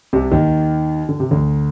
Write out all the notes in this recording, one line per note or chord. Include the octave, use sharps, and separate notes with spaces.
C2 C3
D#2 D#3
D3
C3
D2 D3